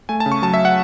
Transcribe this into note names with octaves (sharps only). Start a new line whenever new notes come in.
A3 G#5
A5
C#3
C#6
F#3 A5
E5
F#5